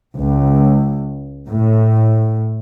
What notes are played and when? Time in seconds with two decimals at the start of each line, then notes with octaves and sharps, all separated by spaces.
0.20 C#2
1.49 A2